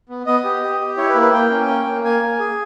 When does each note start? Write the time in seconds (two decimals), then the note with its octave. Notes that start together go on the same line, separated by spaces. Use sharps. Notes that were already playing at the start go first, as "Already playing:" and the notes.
0.09 B3
0.26 B3 D#5
0.45 G4
0.62 G4
0.80 G4
0.97 E4 C#5
1.09 B4
1.15 A#3
1.21 B4
1.33 A#3 G5
1.51 C#4
1.68 A#3
1.86 A#3
2.04 A#3 G#5
2.23 A#3
2.39 G#4